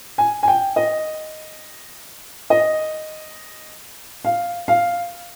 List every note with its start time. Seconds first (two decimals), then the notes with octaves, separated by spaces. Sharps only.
0.18 G#5
0.43 G#5
0.48 G5
0.76 D#5
2.50 D#5
4.25 F5
4.68 F5